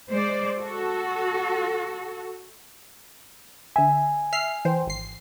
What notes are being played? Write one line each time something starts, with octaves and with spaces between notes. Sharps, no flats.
G#3 C5 D5
F#4 A4
D3 E5 G#5
E5 F6 C7
E3 C5 G5
G#1 C7